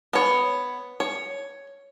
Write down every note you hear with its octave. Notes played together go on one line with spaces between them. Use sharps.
B3 C#5
C#5